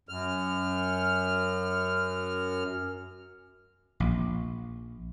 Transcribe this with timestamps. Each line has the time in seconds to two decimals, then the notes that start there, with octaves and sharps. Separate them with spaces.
0.09 F#2 F6
4.00 A#1